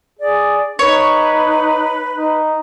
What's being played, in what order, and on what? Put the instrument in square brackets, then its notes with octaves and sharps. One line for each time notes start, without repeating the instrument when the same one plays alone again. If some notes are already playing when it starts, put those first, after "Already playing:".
[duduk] G#4 [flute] D5
[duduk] D#4 [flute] B4 [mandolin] C#5
[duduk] D#4